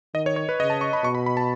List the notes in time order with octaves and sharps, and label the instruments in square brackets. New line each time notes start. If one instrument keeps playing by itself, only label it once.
[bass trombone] D#3 [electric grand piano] D#5
[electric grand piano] C#5
C#5
B4
[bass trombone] C#3 [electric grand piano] D#5
[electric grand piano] A5
C#6
B5
[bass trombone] B2 [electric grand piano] C#6
[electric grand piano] B5
B5
A5